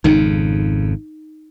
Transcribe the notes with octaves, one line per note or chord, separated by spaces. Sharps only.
G#1 F2 C#3 D#4